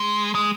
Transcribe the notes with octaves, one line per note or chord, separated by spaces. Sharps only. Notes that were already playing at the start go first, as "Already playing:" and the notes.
Already playing: G#3
G#3